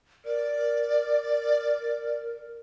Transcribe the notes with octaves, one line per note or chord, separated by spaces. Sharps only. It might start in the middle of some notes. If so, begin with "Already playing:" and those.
A#4 D5